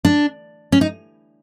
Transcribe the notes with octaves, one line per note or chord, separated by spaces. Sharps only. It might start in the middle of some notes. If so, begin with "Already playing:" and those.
D4
C#4
D#4